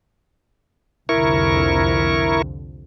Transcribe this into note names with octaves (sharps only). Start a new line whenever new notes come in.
C2 F2 D3 E4 A#4 C#6